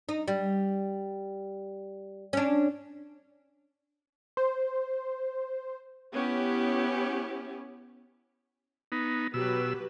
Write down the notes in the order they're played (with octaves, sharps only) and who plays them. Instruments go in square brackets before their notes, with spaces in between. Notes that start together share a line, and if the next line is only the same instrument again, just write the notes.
[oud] D#4
G3
C#4 D4
[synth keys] C5
[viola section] B3 C#4 E4 G4
[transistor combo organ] B3 D#4
[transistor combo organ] B2 E6 [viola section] F#3 G4 B4